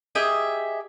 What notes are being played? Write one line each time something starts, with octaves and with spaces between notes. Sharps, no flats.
G4 G#4 D#5 E5